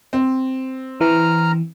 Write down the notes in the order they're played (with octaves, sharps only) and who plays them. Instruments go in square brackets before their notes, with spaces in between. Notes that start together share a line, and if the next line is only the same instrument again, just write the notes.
[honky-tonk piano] C4
[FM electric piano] E3 [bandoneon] A#5 F6